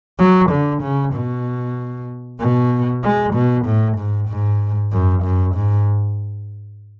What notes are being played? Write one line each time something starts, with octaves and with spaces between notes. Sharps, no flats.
F#3
D3
C#3
B2
B2
G#3
B2
A2
G#2
G#2
F#2
F#2
G#2